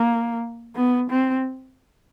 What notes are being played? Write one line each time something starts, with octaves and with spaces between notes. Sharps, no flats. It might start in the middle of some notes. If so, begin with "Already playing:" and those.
Already playing: A#3
B3
C4